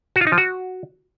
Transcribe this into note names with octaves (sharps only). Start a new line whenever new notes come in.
F#4
F4
D#4
F3
F#4